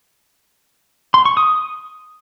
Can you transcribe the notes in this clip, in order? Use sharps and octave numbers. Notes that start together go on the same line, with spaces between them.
C6
C#6
D#6